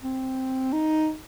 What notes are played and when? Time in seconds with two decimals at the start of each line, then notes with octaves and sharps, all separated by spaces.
0.03 C4
0.73 D#4